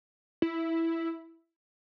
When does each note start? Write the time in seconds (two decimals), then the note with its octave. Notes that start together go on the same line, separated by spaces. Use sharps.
0.42 E4